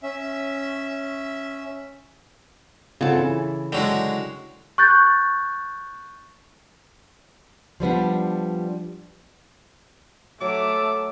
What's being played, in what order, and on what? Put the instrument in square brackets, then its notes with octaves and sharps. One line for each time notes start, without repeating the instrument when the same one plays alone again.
[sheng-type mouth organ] C#4 E5
[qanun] C#3 A4 [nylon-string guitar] C4 F4 F#5
[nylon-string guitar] E3
[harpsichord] D3 F#3 G#3 [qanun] G5
[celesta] C#6 F#6 G6 A6
[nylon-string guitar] F3 G3 B3 D4
[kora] F#3 [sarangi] A3 [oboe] D6